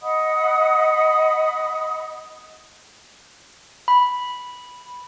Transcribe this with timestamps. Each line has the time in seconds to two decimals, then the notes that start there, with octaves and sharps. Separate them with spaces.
0.01 D#5 F#5 B5 D#6
3.88 B5